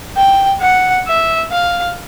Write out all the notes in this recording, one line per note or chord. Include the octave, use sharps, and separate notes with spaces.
G5
F#5
E5
F5